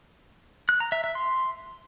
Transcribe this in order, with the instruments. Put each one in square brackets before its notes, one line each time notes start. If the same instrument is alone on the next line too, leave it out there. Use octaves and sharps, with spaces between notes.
[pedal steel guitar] F#6
A#5
E5
E5
C6